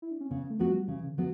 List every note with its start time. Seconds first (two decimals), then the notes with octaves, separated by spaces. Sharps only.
0.02 E4
0.11 D4
0.20 C#4
0.30 C#3 B3
0.50 A3
0.59 F#3 B3 F#4
0.69 G3
0.83 F#3
0.88 C#3 E3
1.03 C#3
1.07 D3
1.18 F#3 B3